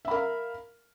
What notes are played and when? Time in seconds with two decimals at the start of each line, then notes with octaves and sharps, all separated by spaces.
0.05 E5
0.08 B5
0.11 A#4
0.14 F5